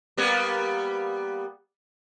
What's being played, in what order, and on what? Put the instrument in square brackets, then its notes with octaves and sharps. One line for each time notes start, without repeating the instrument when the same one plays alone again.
[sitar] G3 A#3 B3